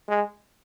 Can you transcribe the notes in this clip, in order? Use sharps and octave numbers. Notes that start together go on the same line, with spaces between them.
G#3